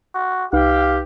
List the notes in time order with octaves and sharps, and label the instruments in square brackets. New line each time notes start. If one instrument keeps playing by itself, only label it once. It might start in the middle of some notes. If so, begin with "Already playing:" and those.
[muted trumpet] F#4
[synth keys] C2 D#4 B4 [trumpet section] G4 [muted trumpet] F5